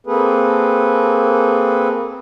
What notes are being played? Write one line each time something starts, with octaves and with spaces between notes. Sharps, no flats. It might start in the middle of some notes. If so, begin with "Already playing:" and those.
A#3 C4 G#4 A4 B4